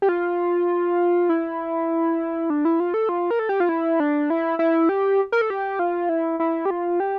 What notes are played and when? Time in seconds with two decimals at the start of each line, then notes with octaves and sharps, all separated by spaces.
0.02 G4
0.09 F4
1.29 E4
2.50 D4
2.65 E4
2.80 F4
2.94 A4
3.09 F4
3.31 A#4
3.39 A4
3.49 G4
3.60 F4
3.69 E4
4.00 D4
4.30 E4
4.59 E4
4.89 G4
5.32 A#4
5.41 A4
5.50 G4
5.79 F4
6.09 E4
6.40 E4
6.65 G4
6.70 F4
7.00 G4